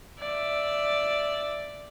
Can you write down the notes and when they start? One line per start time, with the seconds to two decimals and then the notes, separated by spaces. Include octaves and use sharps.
0.19 D5 E5